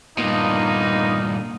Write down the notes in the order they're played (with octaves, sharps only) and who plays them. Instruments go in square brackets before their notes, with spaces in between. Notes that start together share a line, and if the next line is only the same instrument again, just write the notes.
[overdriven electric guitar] G2 A#2 [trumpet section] A#3 B3 D#4